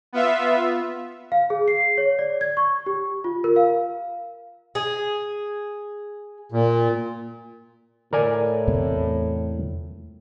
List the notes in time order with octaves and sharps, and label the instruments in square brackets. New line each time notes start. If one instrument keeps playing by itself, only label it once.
[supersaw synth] B3 F4 E5
[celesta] F5
G#4
C7
C#5
D5
G#6
C#6
G4
F4
A#4
F5
[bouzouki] G#4
[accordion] A#2
[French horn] A2 [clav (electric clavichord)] A#4 D5 G#5
[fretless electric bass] E2 C3 A3